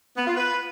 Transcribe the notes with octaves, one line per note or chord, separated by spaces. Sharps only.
B3
F4
B4